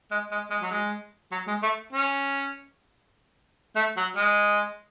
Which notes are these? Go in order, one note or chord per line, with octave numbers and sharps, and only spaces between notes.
G#3
G#3
G#3
F#3
G#3
F#3
G#3
A3
C#4
A3
F#3
G#3